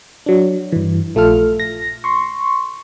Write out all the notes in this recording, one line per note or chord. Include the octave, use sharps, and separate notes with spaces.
F#3 D4
G2 E3
A#1 A3 F4 A4 F6
A#6
C6 C#6